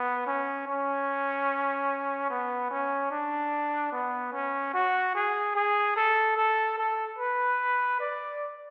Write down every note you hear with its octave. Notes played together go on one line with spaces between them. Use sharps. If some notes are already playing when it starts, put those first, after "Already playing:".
Already playing: B3
C#4
C#4
B3
C#4
D4
B3
C#4
F#4
G#4
G#4
A4
A4
A4
B4
D5